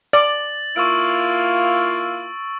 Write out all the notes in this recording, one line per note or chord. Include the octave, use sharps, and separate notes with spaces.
D5 A6 F#7
A#3 E4 F4 C#6 E6 D7